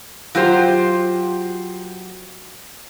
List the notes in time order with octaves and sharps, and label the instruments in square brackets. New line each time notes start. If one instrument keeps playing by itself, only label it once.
[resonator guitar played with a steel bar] F#3 F4 G4 C5